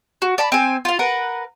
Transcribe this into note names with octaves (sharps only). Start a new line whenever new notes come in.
F#4
D5 A5 B5
C4 G#5
F4 F5
A#4 B4 F#5